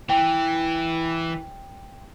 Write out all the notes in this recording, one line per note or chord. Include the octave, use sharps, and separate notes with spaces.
E3 G5